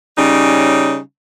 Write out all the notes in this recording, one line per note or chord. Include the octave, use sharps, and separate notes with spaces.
C#3 G3 C#4 D#4